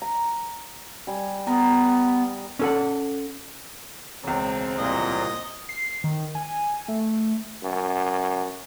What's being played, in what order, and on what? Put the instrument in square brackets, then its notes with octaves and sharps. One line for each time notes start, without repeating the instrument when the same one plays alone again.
[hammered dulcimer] A#5
G3 G#5
[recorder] B3 [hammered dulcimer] A#4
[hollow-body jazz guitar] C#4 A4 F#5
[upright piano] E1 C#2 [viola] C4
[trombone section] C2 A#2 [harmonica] D#5
[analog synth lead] C7
D#3
G#5
A3
[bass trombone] F#2